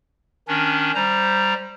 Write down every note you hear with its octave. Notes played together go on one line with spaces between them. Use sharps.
D#3 C#4 D4
G3 C5 A#5